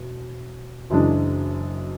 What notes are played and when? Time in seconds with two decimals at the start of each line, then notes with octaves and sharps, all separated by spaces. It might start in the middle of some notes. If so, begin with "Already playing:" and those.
Already playing: E1
0.90 F#1 F#2 E3 G#3 D4